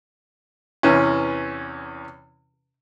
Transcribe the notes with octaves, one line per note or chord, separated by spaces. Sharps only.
E2 C3 E3 C#4